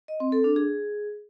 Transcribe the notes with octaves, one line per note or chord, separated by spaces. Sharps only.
D#5
C4
A4
D4
G#4